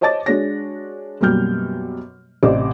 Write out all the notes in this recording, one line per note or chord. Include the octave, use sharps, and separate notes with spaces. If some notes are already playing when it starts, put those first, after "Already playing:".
C5 C#5 D#5 A5 D6 A6
G#3 D4 F#4 C#5 A#6
F#2 B2 G3 A#3 F6 G6
A1 C3 C5 D5 D#5 D6